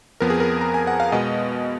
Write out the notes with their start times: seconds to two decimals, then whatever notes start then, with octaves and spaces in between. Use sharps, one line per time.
0.20 F2 F3 B3 A#4
0.30 G#4
0.40 A#4
0.61 A#5
0.74 G#5
0.87 F#5
1.00 F5
1.12 B2 G#3 B3 D#5